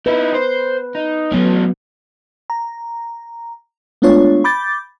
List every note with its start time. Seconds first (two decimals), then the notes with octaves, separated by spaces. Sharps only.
0.06 D#4 E4 B4
0.34 C5
0.95 D#4
1.32 F#3 A3 B3 C#4
2.50 A#5
4.02 G#3 A3 B3 D4 F4 C#5
4.44 B5 D6 G6 A6